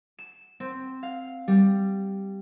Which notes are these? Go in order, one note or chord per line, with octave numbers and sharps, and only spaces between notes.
E7
C4
F5
G3